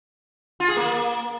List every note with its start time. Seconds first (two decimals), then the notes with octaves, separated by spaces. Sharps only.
0.60 F4
0.68 G#4
0.77 A#3